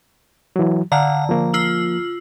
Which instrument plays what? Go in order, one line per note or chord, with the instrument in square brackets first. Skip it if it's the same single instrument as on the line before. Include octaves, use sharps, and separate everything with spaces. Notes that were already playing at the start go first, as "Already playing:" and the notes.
[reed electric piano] E3 F#3
[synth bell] D3 A#5 [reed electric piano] D5 F5 F#5
[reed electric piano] F3 A#3
[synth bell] F4 E6 F#7